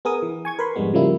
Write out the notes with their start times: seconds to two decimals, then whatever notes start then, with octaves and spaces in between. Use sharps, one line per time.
0.05 B3 G#4 A#4 D#6
0.22 E3
0.45 G#5 C#6 G#6
0.59 A#4 B4 B5 C6
0.76 F2 G#2 G3 G#3 B3
0.93 C#3 F3 G3 A#3 E4